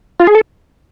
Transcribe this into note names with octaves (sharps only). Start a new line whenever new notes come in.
F4
G#4
A4